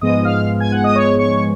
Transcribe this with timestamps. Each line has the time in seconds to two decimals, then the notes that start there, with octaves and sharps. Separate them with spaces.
0.01 G#2 F3 G#3 B3 D#5 D#6
0.25 F5 F6
0.60 G#5 G#6
0.72 F#5 F#6
0.84 D#5 D#6
0.95 C#5 C#6
1.19 C#5 C#6